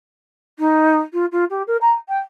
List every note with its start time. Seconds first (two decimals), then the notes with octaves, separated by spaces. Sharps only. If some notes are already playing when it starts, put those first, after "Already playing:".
0.58 D#4
1.13 F4
1.31 F4
1.50 G4
1.67 A#4
1.81 A#5
2.08 G5